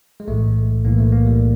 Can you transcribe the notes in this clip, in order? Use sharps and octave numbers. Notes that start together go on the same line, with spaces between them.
G#3
B1 A2 E3 A3
B1 A2 E3 A#3
A3
A#3
G3